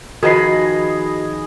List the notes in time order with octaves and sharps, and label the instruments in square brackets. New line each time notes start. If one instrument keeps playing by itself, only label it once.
[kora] D#3 F3 B4 [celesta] F#4 C7 [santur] G#4 D#5 B5